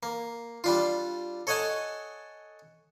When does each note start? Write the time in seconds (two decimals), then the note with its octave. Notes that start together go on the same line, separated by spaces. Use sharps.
0.03 A#3
0.64 G3 D4 F4
1.47 A4 C#5 D#5 F#5 G#5 A5